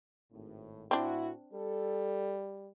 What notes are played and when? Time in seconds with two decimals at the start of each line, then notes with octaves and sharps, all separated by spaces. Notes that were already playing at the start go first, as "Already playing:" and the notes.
0.32 G#1 A2
0.91 A2 C4 D4 E4 F#4
1.54 G3 A4